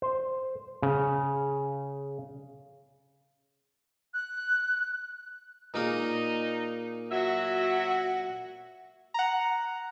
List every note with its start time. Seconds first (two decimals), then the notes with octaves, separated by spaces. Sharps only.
0.02 C5
0.82 C#3
4.14 F#6
5.74 A#2 A#3 D#4 G#4
7.11 F#3 F#4 E5
9.14 F#5 A#5